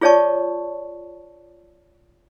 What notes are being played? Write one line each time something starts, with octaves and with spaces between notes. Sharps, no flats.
F4 G#4 C#5 D5 A5 C#6